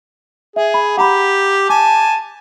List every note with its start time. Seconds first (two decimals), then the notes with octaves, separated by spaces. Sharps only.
0.56 G#4 E5
0.74 B5
0.97 G4 F#5 A#5 B5
1.69 G#5 A5 D6